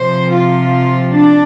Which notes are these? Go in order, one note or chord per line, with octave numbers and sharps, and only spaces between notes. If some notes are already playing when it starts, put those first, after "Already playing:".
Already playing: C3 F3 C5
F4
D4